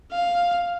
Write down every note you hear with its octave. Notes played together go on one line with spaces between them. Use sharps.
F5